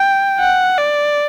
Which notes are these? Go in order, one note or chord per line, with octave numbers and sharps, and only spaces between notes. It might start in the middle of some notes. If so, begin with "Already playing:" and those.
Already playing: G5
F#5
D5